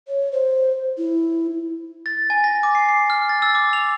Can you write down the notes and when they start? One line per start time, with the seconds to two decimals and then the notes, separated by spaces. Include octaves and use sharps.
0.08 C#5
0.32 C5
0.97 E4
2.06 A6
2.30 G#5
2.44 A#6
2.63 D6
2.75 C7
2.89 C7
3.10 F6
3.29 A6
3.42 E6
3.55 D6
3.73 F7